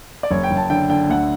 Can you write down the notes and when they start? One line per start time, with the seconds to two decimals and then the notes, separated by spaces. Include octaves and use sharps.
0.23 D5
0.31 F#1 C#5
0.44 G5
0.51 F#1
0.57 A5
0.70 D3 G5
0.90 D3 G5
1.09 D2 F#5